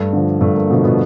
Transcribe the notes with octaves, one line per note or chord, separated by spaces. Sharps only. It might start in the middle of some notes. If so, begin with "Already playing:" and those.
Already playing: G2 A3
D3 F3
G2 A3
A#3
B2 D3 F3 B3
B2 B3